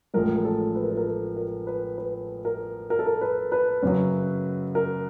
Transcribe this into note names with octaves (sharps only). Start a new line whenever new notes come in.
A1 A2 F3 G#3 A#4
A#4
A4
B4
A#4
A4
A#4
A4
A#4
B4
B4
A#4
A#4
A4
A#4
B4
B4
F#2 C#3 F#3
A#4